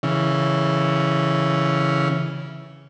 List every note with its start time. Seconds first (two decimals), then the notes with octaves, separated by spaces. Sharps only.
0.03 C#3 E3